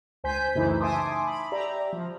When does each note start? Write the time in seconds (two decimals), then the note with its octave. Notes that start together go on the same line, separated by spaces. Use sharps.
0.24 C#2 C5 G#5 G6 B6
0.55 F#2 C#3 E3 A3 D#4 E4
0.80 E5 G#5 A5 C6 D6 D#6
1.27 B5
1.52 G4 D5 E5 A#5
1.93 F3